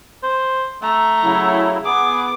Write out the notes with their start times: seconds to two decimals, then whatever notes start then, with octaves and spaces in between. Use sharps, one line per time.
0.23 C5
0.82 A3 A#5
1.23 C#3 F#3 E4
1.85 B3 G#4 D6